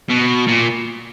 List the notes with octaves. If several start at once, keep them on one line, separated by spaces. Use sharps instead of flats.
B2
A#2